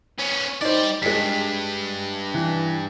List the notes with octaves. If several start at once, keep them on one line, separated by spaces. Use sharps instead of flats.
B3 C#4
G3 D#4 C5 D5
G2 G#3 B6
E3